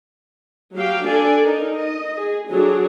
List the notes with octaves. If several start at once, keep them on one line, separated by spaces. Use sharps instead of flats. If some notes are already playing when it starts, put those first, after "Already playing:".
F#3 G4 F5 G5
D4 A4 D5 G#5
D#4 A#4
D#5
G#4
D3 F#3 D4 G#4